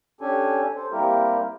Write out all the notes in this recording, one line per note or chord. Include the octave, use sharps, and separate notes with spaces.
C#4 D4 G4 A4 G#5
A4 C5
G3 A#3 C4 E4 G4 A#4